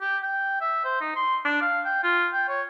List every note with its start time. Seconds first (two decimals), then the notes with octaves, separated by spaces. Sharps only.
0.01 G4
0.23 G5
0.61 E5
0.85 C5
1.01 D#4
1.16 C6
1.45 D4
1.62 F5
1.85 G5
2.03 F4
2.33 G5
2.49 C#5